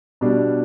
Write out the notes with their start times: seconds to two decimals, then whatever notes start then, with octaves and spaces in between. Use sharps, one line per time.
0.21 B2 G3 D4